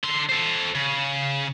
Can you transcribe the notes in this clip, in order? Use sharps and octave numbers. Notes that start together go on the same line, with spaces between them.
D3 C6
A4 C5
C#3